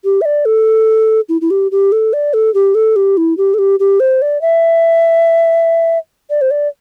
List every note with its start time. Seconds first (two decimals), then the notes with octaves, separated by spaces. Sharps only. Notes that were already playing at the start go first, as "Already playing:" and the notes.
0.05 G4
0.21 E5
0.25 D5
0.45 A4
1.29 E4
1.41 E4
1.51 G4
1.72 G4
1.92 A4
2.13 D5
2.34 A4
2.54 G4
2.75 A4
2.96 G4
3.17 E4
3.37 G4
3.54 A4
3.59 G4
3.80 G4
4.00 C5
4.22 D5
4.42 E5
6.30 D5
6.41 C5
6.51 D5